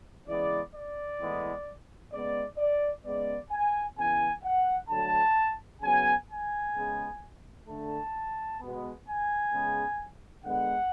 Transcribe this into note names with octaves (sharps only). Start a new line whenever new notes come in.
C#3 E3 G#3 B3 D5
D5
A2 E3 G#3 B3
C#3 G#3 B3 D5
D5
C#3 G#3 B3 D5
G#5
C#3 E3 B3 G#5
F#5
D3 F#3 A3 A5
C#3 F#3 B3 G#5
G#5
C#3 G#3 B3
D3 A3 A5
B2 G#3 B3
G#5
C#3 G#3 B3
D3 G#3 B3 F#5